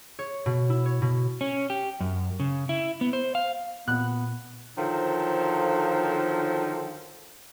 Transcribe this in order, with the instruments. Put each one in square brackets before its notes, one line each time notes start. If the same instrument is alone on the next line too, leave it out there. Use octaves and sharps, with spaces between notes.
[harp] C#5
B2
E4
C#5
B2
[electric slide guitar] C#4
G4
F#2
C#3
E4
B3
C5
F5
[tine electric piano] A#2 [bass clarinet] B3 [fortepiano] F#6
[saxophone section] D3 D#3 F3 F#3 A4 C5